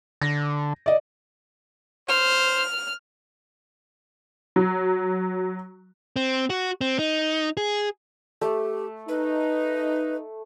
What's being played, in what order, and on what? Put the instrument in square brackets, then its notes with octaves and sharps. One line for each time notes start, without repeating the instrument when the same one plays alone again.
[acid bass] D3 [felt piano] A#6
[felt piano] D5 D#5
[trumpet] C5 [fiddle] F6
[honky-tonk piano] F#3
[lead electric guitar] C4
F#4
C4
D#4
G#4
[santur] A3 [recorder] G4
[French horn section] D#4 [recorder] B4